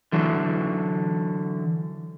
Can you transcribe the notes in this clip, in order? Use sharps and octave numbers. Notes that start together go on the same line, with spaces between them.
D3 E3 F#3